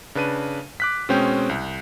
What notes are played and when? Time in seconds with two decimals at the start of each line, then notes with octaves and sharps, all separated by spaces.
0.15 C#3 D4 B4 A5 D#7
0.80 D6 F#6 B6
1.09 B2 G#3 C4 C#4 G5 G6
1.49 C2